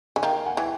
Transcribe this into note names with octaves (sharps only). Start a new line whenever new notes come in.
D3 G#5
D#3 F5 G5
F#5 G#5
E3